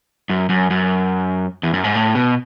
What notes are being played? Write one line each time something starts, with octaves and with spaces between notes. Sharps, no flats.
F#2
F#2
F#2
E2
F#2
G#2
A2
B2